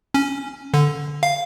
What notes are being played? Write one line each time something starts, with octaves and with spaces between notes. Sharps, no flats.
C#4
D3
F5